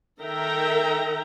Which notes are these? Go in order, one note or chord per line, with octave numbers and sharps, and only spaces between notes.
D#3 A4 A#4 E5 G5 A#5